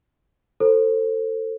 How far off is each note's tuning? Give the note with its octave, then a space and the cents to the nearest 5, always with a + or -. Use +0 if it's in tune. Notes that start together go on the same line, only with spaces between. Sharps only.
F4 +20 A4 +25 C5 +15